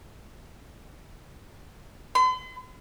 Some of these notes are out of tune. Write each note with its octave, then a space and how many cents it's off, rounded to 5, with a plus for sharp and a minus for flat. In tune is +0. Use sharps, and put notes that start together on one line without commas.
C6 -45